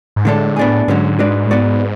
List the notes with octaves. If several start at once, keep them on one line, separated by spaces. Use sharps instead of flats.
G#2
A2 D3 G#3 D4 A4
B3 D4 G#4
G#2 D3 F#3 C#4 F#4
G#3 D4 F#4 B4 D5
A2
G#2 B3 F#4 B4 D5